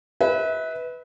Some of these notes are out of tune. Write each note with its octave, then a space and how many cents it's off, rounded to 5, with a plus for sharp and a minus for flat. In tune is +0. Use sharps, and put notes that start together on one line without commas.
B4 +0 E5 -40